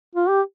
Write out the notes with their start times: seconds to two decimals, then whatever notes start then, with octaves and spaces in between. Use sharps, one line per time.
0.15 F4
0.29 G4